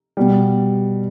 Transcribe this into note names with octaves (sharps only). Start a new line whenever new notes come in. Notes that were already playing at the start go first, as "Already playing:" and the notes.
B2 G3